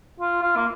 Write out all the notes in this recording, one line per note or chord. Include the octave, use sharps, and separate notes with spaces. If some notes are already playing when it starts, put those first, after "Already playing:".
F4
F4
A#3